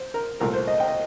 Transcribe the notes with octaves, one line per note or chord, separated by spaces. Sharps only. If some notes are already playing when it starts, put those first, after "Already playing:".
Already playing: C5
A#4
C2 A#2 A3 A#4
C5
D#5
G5
D#5